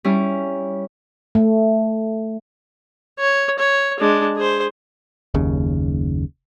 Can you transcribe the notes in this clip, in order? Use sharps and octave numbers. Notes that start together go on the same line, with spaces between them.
G3 C#4 E4
A3
C#5
C#5
G#3 D4
G#4 C5
F#1 D#2 C#3